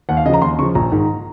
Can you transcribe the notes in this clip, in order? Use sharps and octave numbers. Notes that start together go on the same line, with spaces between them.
D#2 F#5
F5
C#3 F3 D#5 A#5
D#2 C6
C#3 F3 C#6
A#1 A#5
G#2 D#3